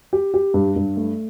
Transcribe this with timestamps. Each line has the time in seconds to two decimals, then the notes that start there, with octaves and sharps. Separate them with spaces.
0.13 G4
0.34 G4
0.54 G2
0.76 G2
0.97 A3